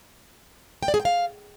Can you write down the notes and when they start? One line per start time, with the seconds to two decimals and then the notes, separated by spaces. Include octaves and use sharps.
0.83 G5
0.88 D5
0.94 G#4
1.00 G5
1.05 F5